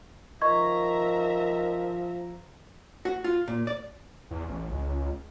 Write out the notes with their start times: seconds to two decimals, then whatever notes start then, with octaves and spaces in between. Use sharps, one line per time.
0.42 D#3 F3 D#5 E5 A#5 C#6 G#6
3.05 F#4
3.24 F4
3.48 A#2
3.67 D5
4.31 E2
4.49 A1
4.71 C#2